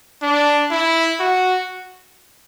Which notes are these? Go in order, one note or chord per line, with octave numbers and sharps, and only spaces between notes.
D4
E4
F#4